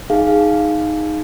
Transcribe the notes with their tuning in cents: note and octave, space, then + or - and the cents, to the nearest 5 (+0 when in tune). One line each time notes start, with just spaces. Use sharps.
D#4 +0 G#4 +0 F5 +0